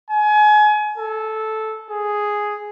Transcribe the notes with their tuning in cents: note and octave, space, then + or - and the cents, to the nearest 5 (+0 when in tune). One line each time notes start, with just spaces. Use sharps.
G#5 +30
A4 -10
G#4 +0